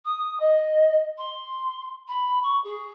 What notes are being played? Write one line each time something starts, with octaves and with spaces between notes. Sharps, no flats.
D#6
D#5
C6
B5
C#6
G#4